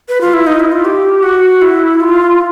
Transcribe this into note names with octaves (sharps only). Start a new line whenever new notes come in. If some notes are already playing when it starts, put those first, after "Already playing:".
B4
F4
E4
D#4
E4
F4
G4
F#4
E4
F4